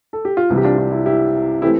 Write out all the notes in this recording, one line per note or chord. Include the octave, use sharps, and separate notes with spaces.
A4
G4
F4
C2 C3 E3 E4
G4
D4 F4
D4 F4
E4
E4 G4
E3 A3 C4 E4 G4